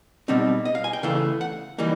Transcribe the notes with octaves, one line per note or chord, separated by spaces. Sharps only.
B2 G3 C4 D#4
D#5
F5
G#5
G5
C#3 E3 A3 F5
F#5
E3 G3 A#3 D#4